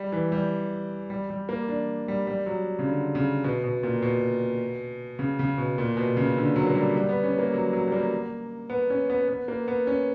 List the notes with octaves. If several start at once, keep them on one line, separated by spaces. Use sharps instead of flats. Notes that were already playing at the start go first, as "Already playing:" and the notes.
Already playing: G3
E3
G3
G3
G3
A#3
D4
G3
G3
F#3
C#3
D3
C#3
B2
B2
A#2
B2
C#3
C#3
B2
A#2
B2
C#3
D3
F#3
A#3
G3
G3
B3
C#4
A#3
F#3
F#3
G3
A#3
B3
C#4
B3
B3
A#3
B3
C#4